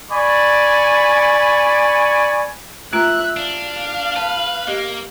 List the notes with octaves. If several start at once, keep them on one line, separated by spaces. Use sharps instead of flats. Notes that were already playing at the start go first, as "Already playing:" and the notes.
D5 G#5 B5 C#6
A3 F4 E5 A#5 F#6
D4 F5
B4 A5
A#3 G4 D#5